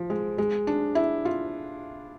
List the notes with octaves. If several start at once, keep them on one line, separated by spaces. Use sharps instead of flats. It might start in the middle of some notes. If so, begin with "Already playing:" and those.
Already playing: F3
G#3
G#3
D4
E4
F4